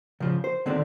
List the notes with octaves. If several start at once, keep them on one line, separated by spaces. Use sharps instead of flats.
C#3 F3
C5
D3 D#3 A3 C4 D4